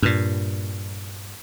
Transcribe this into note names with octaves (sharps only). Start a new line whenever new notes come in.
G2 A#2